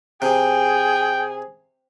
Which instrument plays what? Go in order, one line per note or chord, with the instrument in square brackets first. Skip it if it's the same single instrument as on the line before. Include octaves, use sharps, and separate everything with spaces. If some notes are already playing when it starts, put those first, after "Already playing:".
[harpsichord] C3 [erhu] G#4 [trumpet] G5